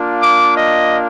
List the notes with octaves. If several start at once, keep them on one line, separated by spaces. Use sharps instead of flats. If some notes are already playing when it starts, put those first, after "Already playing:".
Already playing: A#3 D4 F4
D6
D#5